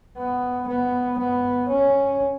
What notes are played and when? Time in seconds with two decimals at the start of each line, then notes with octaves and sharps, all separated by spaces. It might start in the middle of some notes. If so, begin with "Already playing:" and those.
0.17 B3
0.67 B3
1.19 B3
1.69 C#4